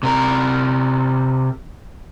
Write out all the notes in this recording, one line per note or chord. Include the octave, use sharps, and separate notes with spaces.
C3 A#4